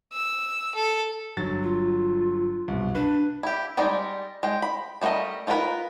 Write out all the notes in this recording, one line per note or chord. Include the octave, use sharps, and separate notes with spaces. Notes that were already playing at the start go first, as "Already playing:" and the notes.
E6
A4
G1 F#3 A6
F4
C2 F#2 B2
D4 B4
E4 G4
G3 G#3 D#4 D5
G#3 G5
B5
G3 A3 F#4 A#4 D#5
D#4 F4 G#4 A#4 B4